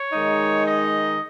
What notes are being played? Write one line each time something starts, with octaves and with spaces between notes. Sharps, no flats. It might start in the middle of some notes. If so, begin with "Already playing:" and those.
Already playing: C#5
D#3 G#3 D#4
D#5